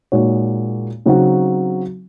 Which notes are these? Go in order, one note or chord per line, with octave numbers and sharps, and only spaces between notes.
A#2 G#3 D#4 F#4 C#5
C#3 F#3 C4 D#4 F#4